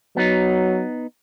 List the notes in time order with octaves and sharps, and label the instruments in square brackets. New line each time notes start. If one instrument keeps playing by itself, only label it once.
[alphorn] F#3 [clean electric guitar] B3 D#4